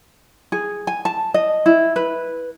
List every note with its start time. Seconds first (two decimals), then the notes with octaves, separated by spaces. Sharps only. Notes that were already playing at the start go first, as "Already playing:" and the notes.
0.52 G#4
0.87 G#5
1.05 A5
1.34 D#5
1.66 E4
1.96 B4